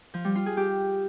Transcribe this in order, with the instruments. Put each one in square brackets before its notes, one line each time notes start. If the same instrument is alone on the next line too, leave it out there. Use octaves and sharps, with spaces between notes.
[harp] F3
G3
F4
G#4
G4